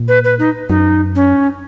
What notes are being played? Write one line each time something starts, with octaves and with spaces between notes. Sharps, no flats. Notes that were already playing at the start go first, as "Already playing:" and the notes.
Already playing: A#2
B4
B4
D#4
F#2 D#4
C#4